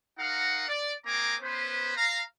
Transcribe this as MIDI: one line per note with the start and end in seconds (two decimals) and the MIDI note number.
0.19 0.64 63
0.19 0.64 66
0.19 0.64 70
0.19 0.64 77
0.19 0.64 78
0.68 0.93 74
1.06 1.35 58
1.06 1.35 60
1.06 1.35 75
1.06 1.35 80
1.06 1.35 82
1.06 1.35 86
1.42 1.93 59
1.42 1.93 61
1.42 1.93 71
1.42 1.93 72
1.96 2.21 77
1.96 2.21 82